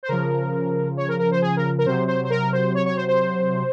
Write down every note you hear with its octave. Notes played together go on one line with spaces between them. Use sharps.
C5
C#3 F3 A#4
C#5
A#4
A#4
C5
G#4
A#4
A#4
C3 F#3 C5
C5
C5
A#4
C5
C#5
C#5
C5
C5